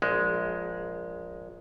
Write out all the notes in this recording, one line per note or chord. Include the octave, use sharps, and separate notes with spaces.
A#1 G#3